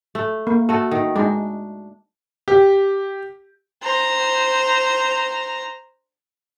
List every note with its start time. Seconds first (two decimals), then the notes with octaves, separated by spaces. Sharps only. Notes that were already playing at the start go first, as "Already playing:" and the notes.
0.15 A3
0.47 A#3
0.69 A3 F#4 A4
0.91 D#3
1.16 G#3 D4 D#4
2.48 G4
3.83 C5 A#5